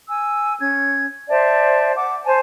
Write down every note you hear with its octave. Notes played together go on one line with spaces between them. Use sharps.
G#5 E6
C#4 G#6
C5 D5 E5 A5
F#5 D6
C5 G#5 A5